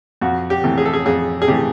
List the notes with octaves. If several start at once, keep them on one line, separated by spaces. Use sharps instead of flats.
F2 F#4
G4
C3 E3 A3
G#4
A4
G#4
F2 G#4
G#4
C3 E3 A3 G4